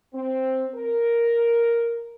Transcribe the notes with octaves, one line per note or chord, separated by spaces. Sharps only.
C4
A#4